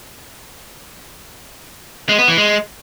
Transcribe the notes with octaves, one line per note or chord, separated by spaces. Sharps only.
G#3
B3
E3
G#3